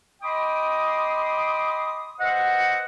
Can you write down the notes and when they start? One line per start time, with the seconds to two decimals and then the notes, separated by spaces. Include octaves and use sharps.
0.22 D#5 G5 B5 C6 D6 D#6
2.20 B4 C5 D#5 E5 F#5